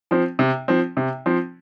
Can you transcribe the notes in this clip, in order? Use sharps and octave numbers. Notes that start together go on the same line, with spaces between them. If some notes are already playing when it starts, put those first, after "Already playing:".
F3 C4
C3
F3 C4
C3
F3 C4